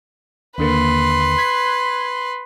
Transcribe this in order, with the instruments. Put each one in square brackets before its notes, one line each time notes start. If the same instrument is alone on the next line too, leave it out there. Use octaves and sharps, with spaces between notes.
[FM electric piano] D#2 D3 A#3 [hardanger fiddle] B4 C6
[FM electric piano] F#6 G#6 B6